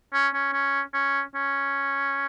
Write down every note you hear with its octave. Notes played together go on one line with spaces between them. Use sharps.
C#4
C#4
C#4
C#4
C#4